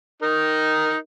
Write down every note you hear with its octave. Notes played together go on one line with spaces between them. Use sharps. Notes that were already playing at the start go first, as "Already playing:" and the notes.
D#4 A#4